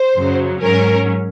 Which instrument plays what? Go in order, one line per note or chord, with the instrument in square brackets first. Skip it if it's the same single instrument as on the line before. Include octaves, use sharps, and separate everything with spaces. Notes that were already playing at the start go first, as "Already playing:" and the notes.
Already playing: [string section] C5
F#2 C#3 F#3
G#2 F#3 C#4 A#4